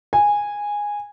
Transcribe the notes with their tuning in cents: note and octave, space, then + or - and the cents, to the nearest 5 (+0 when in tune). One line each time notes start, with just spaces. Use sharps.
G#5 -10